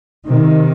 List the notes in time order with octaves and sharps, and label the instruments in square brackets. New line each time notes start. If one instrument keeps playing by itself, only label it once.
[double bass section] C3 D#3